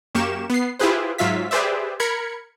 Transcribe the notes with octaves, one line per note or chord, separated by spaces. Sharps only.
F#2 A#3 G4 C#6 E7
B3 C7
E4 F4 G4 G#4 B4 C5
G#2 F#3 F4 E5 F5 B6
G4 G#4 B4 C5 D5 E5
A#4 B5 G#6 C#7